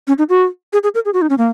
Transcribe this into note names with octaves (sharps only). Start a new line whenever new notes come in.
C#4
D#4
F#4
G#4
G#4
A#4
G#4
F#4
D#4
C#4
A#3